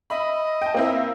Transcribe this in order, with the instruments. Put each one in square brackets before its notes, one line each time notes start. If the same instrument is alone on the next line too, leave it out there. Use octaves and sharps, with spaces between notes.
[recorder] D#5 [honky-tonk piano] E5 B5
[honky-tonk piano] G5 A5
A#3 C4 E4